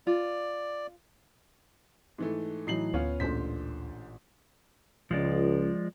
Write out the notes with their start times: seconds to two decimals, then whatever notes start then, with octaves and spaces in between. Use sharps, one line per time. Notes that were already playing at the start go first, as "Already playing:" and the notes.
0.07 F4 D5
2.18 G#2 E3 A3
2.67 A2 E3 F#3 D#4 C7 F#7
2.94 D2 B3 C#4 F4 C#5
3.20 A1 A#2 D3 C5 B6
5.11 C#2 F3 G#3 D5